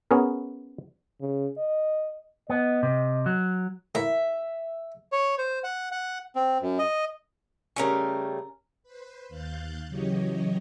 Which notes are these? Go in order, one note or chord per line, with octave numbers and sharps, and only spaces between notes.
B3 C#4 G#4 A#4
C#3
D#5
B3 D#5
C3
F#3
A2 A#3 E5
C#5
C5
F#5
F#5
C4
F#2
D#5
C#3 G3 A3 C#4 A#4
B4 C5
D#2 F5 F#6 G6 A6
C#3 E3 F#3 G4 C#5 D#5